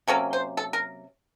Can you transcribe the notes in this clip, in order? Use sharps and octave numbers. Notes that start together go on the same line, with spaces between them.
C3 F#3 A#3 C#4 A4
C5
A4
A#4